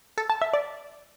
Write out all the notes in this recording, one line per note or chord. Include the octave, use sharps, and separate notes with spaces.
A4
A5
E5
D5